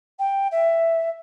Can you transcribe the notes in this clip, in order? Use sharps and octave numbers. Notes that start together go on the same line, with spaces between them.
G5
E5